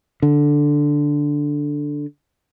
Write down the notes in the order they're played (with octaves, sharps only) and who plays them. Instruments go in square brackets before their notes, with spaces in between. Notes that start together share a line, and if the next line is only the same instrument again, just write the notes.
[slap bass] D3